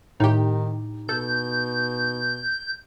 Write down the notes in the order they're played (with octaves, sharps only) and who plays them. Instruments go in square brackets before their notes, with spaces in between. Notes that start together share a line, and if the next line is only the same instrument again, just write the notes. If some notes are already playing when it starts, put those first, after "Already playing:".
[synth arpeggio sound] A2 G4 [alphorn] D#3 [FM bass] D#4
[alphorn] B2 [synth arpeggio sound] A4 [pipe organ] G6